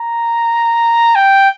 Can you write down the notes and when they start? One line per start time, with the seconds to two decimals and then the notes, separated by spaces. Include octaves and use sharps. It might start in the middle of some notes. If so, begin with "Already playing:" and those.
Already playing: A#5
1.15 G5